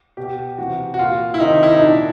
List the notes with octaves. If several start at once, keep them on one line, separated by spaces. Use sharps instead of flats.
B2 G4
C3 E3 F#4
F#4
A#2 F4
E4
C3 D#3 D#4
E4
D#4
A#2 D4